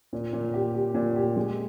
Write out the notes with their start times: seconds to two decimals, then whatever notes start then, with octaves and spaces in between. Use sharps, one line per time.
0.13 A#2
0.33 A#2
0.54 G4
0.75 G4
0.94 A#2
1.16 G4
1.36 G#3